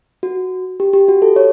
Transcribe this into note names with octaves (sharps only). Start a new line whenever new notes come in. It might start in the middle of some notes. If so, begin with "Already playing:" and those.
F#4
G4
G4
F#4
A4
C#5